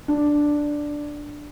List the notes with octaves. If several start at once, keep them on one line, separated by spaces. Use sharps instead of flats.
D4